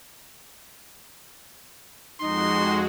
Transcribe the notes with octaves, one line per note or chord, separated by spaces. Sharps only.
F2 G#3 D#4 F#4 C6